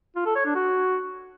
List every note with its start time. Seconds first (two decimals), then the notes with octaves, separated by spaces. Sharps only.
0.16 F4
0.26 A4
0.36 C#5
0.45 D4
0.55 F#4